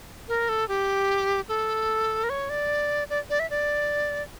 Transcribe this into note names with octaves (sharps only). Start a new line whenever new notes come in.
A#4
A4
G4
A4
A#4
C#5
D5
D5
D5
E5
D5